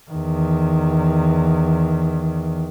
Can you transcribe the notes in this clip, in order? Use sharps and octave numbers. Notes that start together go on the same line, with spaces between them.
E2 D#3